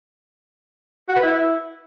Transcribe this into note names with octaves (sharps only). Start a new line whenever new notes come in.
F#4
B4
E4